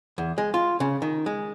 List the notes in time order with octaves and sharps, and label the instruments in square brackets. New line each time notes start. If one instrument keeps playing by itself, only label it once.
[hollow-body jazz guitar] E2
G#3
F4
C#3
D#3
G#3